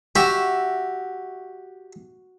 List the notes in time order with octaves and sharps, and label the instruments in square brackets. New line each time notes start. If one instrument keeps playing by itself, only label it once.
[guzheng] F#4 E5 [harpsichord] G4